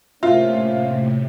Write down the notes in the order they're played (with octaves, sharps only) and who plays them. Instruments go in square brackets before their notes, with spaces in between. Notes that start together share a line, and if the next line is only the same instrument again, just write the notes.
[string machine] A2 C3 [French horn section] A#3 C#4 C5 [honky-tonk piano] F4 [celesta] E5